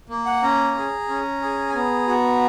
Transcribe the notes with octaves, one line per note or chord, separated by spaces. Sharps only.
A#3
F#5
C#4 A#5
G#4
C#4
G#4
G#5
B3 A#5
F#4